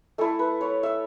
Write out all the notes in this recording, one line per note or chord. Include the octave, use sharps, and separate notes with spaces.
A3 E4 A4
B4
C#5
E5